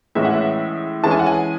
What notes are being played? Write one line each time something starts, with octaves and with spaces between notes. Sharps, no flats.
A2 E3 G#3 C#4 E5
F#5
E5
E3 G#3 C#4 A5
G#5
F#5
G#5